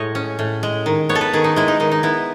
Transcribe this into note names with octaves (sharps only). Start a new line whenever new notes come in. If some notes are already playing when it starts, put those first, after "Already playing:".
Already playing: A2 G#3 C#5 D#5
C#4
A2
G#3
D#3
B3 C#5
A4
B4
D#3 G#4
D#4
G#3 E4
D#4
D#3 D#4
D#4
B3 E4